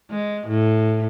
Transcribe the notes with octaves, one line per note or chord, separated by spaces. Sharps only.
G#3
A2